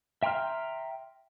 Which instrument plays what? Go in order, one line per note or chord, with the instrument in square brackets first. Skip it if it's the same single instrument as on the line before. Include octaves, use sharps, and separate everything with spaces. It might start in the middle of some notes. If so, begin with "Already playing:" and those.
[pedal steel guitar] E5 G5 A#5 C6 F6